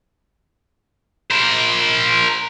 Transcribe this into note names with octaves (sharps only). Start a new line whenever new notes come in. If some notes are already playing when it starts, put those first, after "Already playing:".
A#4 C5